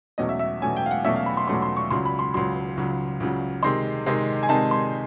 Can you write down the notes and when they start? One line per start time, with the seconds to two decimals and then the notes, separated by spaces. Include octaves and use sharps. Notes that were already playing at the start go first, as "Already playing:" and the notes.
0.18 E2 B2 F#3 A3 C#4 D#5
0.29 E5
0.39 E5
0.61 E2 B2 F#3 A3 C#4 G#5
0.76 G5
0.86 F5
0.91 F#5
1.04 E2 B2 F#3 A3 C#4 E5
1.16 F5
1.26 B5
1.37 C6
1.48 E2 B2 F#3 A3 C#4 C6
1.62 C6
1.77 C#6
1.90 C#2 C#3 F#3 C6
2.05 B5
2.19 C6
2.34 C#2 C#3 F#3 C6
2.77 C#2 C#3 F#3
3.20 C#2 C#3 F#3
3.63 C3 D#3 G#3 C4 D#4 C6
4.06 C3 D#3 G#3 C4 D#4
4.43 G#5
4.49 C3 D#3 G#3 C4 D#4 A5
4.71 C6